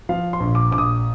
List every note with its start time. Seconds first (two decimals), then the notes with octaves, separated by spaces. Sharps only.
0.09 F3 F5
0.33 C6
0.40 A#1
0.55 D6
0.71 A#1 D6
0.78 D#6